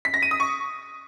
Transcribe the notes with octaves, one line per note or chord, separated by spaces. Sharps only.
B6
A#6
D#7
D#6
C#6